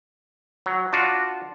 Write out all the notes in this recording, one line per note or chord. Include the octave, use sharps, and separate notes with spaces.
F#3
D4 F4 F#4